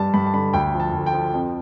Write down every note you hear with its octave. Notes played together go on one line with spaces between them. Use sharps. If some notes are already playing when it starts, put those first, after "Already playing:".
Already playing: G2 G3 A5
G2 B5
A5
D3 B5
D2 G5
F3
A5
D2
G5
F3
F2